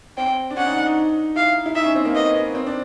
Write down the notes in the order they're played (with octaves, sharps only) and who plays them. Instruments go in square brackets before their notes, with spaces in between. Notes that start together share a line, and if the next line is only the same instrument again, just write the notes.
[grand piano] C4 [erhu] G5
[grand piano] D4
[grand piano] C#4 [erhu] F#5
[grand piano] D#4
D4
D#4
[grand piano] E4 [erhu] F5
[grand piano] E4
[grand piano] D#4 [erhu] E5
[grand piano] C#4
C4
A#3
[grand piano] B3 [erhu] D#5
[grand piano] B3
C4
D4